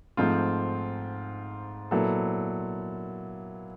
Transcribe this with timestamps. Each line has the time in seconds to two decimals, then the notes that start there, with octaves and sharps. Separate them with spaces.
0.17 G#2 F3 A3 C4 F4
1.91 A#2 F#3 B3 E4 A4